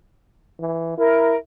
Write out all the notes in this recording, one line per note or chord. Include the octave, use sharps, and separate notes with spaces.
E3
E4 A#4